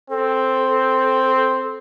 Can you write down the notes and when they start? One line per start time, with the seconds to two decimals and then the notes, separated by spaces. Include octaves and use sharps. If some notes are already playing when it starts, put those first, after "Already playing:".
0.10 C4 A4